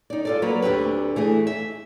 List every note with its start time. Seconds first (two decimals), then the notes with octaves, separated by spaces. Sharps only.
0.10 D#4 D5
0.25 F4 A4 D5
0.42 F#3 A#3 B4
0.62 D2 D3 C4 G4 B4
1.16 E3 A3 G#4
1.47 E5